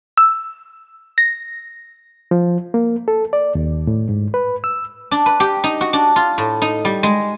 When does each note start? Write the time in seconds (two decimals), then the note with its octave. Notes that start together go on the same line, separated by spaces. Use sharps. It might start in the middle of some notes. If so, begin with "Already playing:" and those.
0.17 E6
1.18 A#6
2.31 F3
2.74 A#3
3.08 A4
3.33 D5
3.55 D#2
3.87 A2
4.09 G#2
4.34 B4
4.64 E6
5.11 D4
5.26 B4
5.40 G4
5.64 D#4
5.81 F#4
5.93 D4
6.16 F4
6.38 A2
6.62 D#4
6.85 G3
7.03 G#3